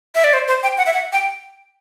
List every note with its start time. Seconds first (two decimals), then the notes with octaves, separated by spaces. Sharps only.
0.15 E5
0.24 D5
0.33 C5
0.48 C5
0.63 G5
0.78 F#5
0.86 E5
0.94 F#5
1.13 G5